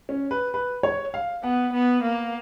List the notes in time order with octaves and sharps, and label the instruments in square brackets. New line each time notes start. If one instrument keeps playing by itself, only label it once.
[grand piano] C#4
B4
B4
C#5
F5
[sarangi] B3 [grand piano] F#5
[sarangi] B3
A#3